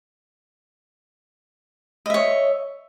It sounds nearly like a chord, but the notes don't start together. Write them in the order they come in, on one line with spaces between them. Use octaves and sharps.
D#5 E5 C#5